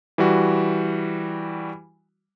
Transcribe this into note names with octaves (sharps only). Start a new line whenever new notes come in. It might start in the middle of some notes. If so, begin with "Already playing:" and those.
E3 G3 F#4